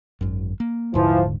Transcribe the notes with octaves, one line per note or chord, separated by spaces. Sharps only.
G#1 F#2
A#3
D#1 G#2 D3 E3 F3